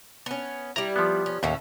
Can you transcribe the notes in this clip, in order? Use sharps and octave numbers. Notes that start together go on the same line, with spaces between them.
B3 C#4
G3 E4 A#5
F3 B3
C#4
D#2 A2 C#4 E5